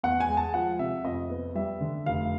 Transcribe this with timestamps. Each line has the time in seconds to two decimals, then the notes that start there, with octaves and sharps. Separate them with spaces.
0.03 E2 F#5
0.20 G#5
0.29 G#3
0.37 A5
0.54 F3 F#5
0.79 C3 E5
1.04 F2 D#5
1.30 B3
1.55 G3 E5
1.81 D3
2.06 F1 F5